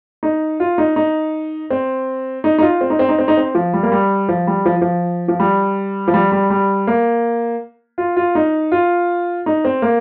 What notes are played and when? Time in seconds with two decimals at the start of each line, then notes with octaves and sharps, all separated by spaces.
0.23 D#4
0.60 F4
0.78 D#4
0.96 D#4
1.70 C4
2.44 D#4
2.58 D#4
2.62 F4
2.81 C4
2.90 D#4
2.99 C4
3.09 D#4
3.18 C4
3.28 D#4
3.37 C4
3.55 F3
3.73 G3
3.83 A#3
3.92 G3
4.29 F3
4.47 G3
4.66 F3
4.82 F3
5.28 F3
5.40 G3
6.08 F3
6.14 G3
6.32 G3
6.50 G3
6.87 A#3
7.98 F4
8.17 F4
8.35 D#4
8.72 F4
9.46 D#4
9.65 C4
9.82 A#3